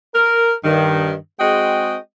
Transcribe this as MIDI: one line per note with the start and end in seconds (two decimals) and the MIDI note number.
0.15 0.54 70
0.64 1.14 43
0.64 1.14 51
1.39 1.96 56
1.39 1.96 60
1.39 1.96 66
1.39 1.96 68
1.39 1.96 75
1.39 1.96 79